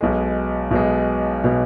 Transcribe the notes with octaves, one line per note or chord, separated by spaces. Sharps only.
B1 B2 G#3
B1 B2 G#3
B2 G#3